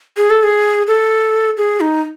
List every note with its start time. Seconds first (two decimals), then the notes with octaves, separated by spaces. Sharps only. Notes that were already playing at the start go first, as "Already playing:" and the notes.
0.17 G#4
0.30 A4
0.43 G#4
0.87 A4
1.57 G#4
1.81 D#4